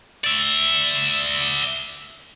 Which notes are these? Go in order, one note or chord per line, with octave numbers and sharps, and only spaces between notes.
D5 E5